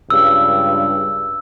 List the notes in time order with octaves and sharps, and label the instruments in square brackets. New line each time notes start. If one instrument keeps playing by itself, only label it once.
[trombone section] C#2 G2 [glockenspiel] E6